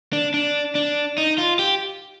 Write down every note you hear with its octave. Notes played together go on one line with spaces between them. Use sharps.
D4
D4
D4
D#4
F4
G4